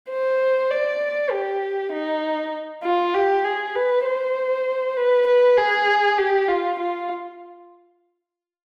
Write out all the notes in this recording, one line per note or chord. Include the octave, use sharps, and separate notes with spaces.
C5
D5
G4
D#4
F4
G4
G#4
B4
C5
B4
B4
G#4
G4
F4
F4